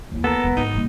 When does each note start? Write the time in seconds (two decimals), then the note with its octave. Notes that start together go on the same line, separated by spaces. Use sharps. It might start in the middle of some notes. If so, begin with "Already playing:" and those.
0.12 D#2 E3
0.24 B3 A4 A#4
0.44 E1 G2
0.57 G#1 D#3 D#4
0.74 G2 A#2